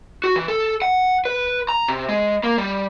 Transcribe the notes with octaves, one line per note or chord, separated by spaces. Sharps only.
F#4
E3
A4
F#5
B4
A#5
C3
G#3
A#3
G3